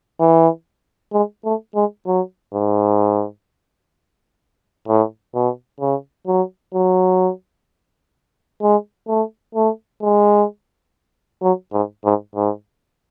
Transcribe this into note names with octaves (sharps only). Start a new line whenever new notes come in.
E3
G#3
A3
G#3
F#3
G#2
A2
B2
C#3
F#3
F#3
G#3
A3
A3
G#3
F#3
G#2
G#2
G#2